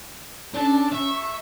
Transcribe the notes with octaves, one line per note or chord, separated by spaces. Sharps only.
C#4 D4 A4
E5 C#6